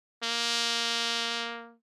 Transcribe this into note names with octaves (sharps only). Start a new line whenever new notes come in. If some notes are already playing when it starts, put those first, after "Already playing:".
A#3